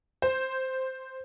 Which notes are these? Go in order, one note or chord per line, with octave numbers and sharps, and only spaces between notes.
C5